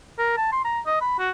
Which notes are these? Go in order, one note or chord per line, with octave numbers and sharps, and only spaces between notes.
A#4
A5
C6
A#5
D#5
B5
F#4